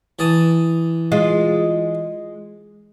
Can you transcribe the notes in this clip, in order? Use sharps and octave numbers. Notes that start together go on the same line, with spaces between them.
E3 A5 D#6
G#3 F4